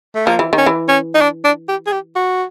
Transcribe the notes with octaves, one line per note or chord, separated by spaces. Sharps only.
A3
F3 A#3
E3
D#3 C#4
E3
C#4
D#4
D4
D4
G4
G#4
G4
F#4